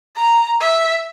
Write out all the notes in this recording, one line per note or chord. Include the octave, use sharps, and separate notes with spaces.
A#5
E5